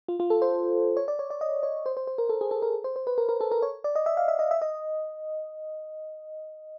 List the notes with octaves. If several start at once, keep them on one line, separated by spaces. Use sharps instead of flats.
F4
F4
A4
C5
C#5
D5
C#5
D5
D#5
C#5
C5
C5
C5
A#4
A4
G#4
A4
A#4
C5
C5
B4
A#4
A#4
A4
A#4
C#5
D5
D#5
E5
F5
E5
D#5
E5
D#5